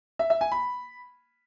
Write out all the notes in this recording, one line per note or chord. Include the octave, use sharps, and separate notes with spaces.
E5
E5
G#5
B5